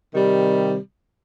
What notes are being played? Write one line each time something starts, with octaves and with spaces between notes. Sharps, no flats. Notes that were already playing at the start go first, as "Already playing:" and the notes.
C3 D#3 G3